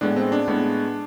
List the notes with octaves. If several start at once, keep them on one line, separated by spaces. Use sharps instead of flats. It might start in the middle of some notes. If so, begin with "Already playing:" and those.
A2 G#3 B3 D4
C4
D4
A2 G#3 B3